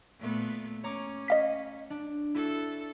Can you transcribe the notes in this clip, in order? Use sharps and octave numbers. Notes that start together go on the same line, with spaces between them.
A#2 A3 B3
C#4 C#5 A#5 D6
D#5 F5 B6
D4
E4 F#4 A4